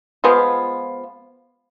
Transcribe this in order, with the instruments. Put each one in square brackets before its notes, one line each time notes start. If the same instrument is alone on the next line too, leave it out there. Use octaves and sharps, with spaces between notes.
[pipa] F3 G#3 B3 F4